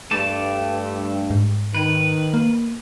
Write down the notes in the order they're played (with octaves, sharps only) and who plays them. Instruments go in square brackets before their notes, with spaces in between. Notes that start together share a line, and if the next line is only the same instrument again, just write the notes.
[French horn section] G2 [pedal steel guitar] A3 A5 D6
[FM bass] G#2
[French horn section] D#3 [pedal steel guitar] B4
[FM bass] A#3